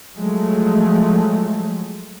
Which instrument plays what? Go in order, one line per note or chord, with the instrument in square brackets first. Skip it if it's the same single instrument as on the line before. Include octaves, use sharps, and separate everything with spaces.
[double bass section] F3 F#3 G#3 A3